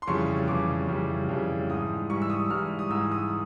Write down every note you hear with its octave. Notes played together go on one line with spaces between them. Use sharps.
C6
F2 C#3 E3 G3 C#6
F2 C#3 E3 G3 D6
F2 C#3 E3 G3
F2 C#3 E3 G3
G#2 E3 G3 D#6
G#2 E3 G3 C#6
E6
D#6
G#2 E3 G3 F6
D#6
G#2 E3 G3 E6
D#6